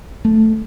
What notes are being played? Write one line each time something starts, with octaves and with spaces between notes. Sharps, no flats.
A3